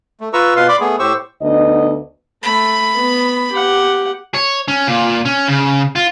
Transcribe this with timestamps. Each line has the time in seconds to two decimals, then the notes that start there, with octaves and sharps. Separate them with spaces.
0.21 A3
0.33 F4 B4 A#5 C#6 E6
0.56 B2 F4 B4 F5 C6
0.69 D5 B5 C6 D6
0.80 A3 B3 G#4
0.99 A2 G4 C5 C#6 E6
1.42 D2 B3 D#4 D#5
2.43 A3 B5
2.95 B3
3.51 G4 F#5
4.34 C#5
4.68 C#4
4.87 A#2
5.25 C#4
5.48 C#3
5.96 F4